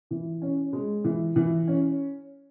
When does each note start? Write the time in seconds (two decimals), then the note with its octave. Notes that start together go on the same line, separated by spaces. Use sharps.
0.11 E3
0.42 C#4
0.73 G#3
1.04 E3
1.36 E3
1.68 C#4